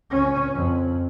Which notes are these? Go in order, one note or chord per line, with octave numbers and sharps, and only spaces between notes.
C#2 C#4
F2